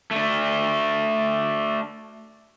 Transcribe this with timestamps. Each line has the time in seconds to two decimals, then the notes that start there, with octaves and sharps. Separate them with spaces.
0.11 A3 D4